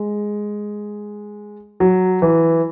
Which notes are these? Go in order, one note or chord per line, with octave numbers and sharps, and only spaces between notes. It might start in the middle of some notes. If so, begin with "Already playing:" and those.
Already playing: G#3
F#3
E3